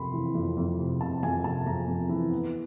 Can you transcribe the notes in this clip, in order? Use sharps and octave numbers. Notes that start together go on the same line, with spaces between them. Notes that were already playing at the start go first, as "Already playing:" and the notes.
Already playing: F2 C3 B5 C6
E3
F2
F2
C3
C3 A5
F2 G#5
C3 A5
F2 A#5
F2
E3
B3